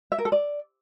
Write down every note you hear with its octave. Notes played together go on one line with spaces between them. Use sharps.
E5
A#4
A4
D5